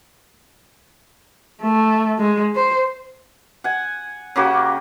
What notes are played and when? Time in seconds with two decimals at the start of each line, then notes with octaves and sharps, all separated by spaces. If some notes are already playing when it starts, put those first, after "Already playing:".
1.62 A3
2.19 G#3
2.56 C5
3.64 F#5 G#5
4.36 C#3 A#3 F#4 G4